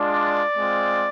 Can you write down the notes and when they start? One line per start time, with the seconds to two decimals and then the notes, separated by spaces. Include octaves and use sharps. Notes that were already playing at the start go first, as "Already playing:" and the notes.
Already playing: G#3 D4 F4 D5
0.56 G#3 C4 F4